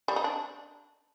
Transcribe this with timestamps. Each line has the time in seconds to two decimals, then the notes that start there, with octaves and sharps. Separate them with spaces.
0.08 G3
0.16 D#4
0.24 D4